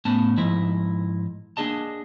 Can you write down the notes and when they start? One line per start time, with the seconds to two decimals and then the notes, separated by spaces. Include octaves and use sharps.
0.05 A2 B3 C#4 A5
0.37 G#2 F3 E4 D#5
1.57 A#3 D4 G#4 D#5 A5